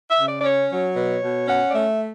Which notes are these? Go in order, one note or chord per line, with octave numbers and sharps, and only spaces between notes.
E5
C#3
D5
D5
C#4 C#5
F#3 C#5
B2
B2
C#4 F#5
D5
A3 E5